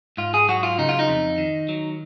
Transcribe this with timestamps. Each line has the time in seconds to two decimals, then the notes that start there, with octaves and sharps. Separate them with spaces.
0.17 G#2 F4
0.34 G#4
0.49 F#3 F#4
0.63 F4
0.78 C#3 D#4
0.89 F4
0.99 D#4
1.09 F2
1.38 D#3
1.69 F#3